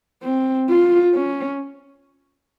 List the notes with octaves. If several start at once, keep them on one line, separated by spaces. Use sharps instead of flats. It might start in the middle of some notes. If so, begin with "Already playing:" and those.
C4
F4
C#4